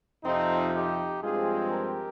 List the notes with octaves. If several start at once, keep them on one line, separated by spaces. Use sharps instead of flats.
F2 C3 F3 C4 D#4
D#4 G4
G2 F3 G#3 C4 F4 G#4
G4 A#4